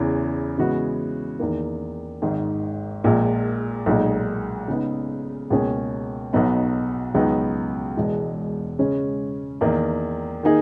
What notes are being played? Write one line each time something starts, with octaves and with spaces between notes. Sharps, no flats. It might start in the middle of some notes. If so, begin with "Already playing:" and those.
Already playing: E2 C#3 E3
C#3 E3 G#3 B3 F#4
E2 D#3 A#3
G#1 G#2 D#3
A#1 A#2 G#3
B1 A#2 G#3 D#4
C#3 G#3 B3 D#4
C#2 B2 A#3 C#4 G#4
B1 B2 F#3 B3 D#4
C#2 C#3 F#3 B3 D#4
E1 E2 B2 G#3
C#3 G#3 C#4
E2 D#3 A#3 D#4
D#3 A#3 D#4 G#4